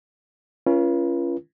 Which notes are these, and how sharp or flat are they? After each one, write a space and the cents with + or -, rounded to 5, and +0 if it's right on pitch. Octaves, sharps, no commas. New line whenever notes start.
C#4 +0 F4 -35 B4 -40